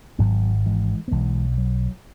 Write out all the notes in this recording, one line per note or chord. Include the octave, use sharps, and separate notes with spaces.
G#1 G#2 F#3 B3
E3 G#3
B3
B1 B2 E3 G#3
F#3